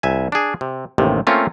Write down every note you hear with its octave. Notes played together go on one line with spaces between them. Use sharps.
C2 E5 G#5
D4 G#4
C3
A1 D#2 C3 D#3
A3 A#3 C4 C#4 F4